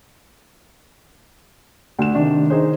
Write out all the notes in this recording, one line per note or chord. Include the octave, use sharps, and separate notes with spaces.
D2 E7
C3 D#3 D4
D#4 G#4 C5